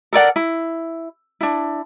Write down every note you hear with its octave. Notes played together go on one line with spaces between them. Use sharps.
A4 A#4 D5 F#5
E4
D4 E4